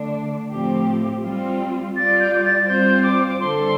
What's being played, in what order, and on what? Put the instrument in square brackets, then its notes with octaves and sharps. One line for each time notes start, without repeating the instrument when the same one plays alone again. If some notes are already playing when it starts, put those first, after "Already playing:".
Already playing: [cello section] D3 A3 D4
A2 F3 A3 C4 G4
G3 C4 F4
[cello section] G3 F4 D5 [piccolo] A6
[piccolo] G6
A6
[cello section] G3 C4 F4 C5 [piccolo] G6
[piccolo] D6
D6
[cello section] D3 G3 C4 A4 C5 [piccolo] C6